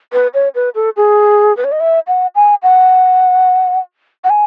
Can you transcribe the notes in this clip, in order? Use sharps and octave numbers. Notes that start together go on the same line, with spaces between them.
B4
C#5
B4
A4
G#4
B4
C#5
D#5
E5
F#5
G#5
F#5
F#5
G#5